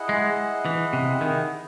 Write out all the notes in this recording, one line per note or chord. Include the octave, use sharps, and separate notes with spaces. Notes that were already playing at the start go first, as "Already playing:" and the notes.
Already playing: E4 G#4 D#5 F#5
G#3
E3
C3
D#3